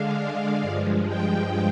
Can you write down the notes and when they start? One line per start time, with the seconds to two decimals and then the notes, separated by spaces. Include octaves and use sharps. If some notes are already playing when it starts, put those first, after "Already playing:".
Already playing: D3 G#3 D4 F5
0.62 G2 F3 G#3
1.07 G5